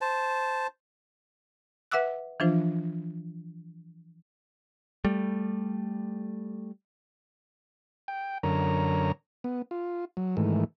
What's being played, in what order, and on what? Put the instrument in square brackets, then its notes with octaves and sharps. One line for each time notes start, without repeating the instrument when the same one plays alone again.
[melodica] C5 A5
[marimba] B4 E5 F#5 D6 E6 F#6
E3 F3 D4 F4 C5
[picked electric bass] G3 A3
[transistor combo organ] G5
F#2 D3 A#4 C#5 A#5
B3
F4
F#3
G#2 D#3 E3 A3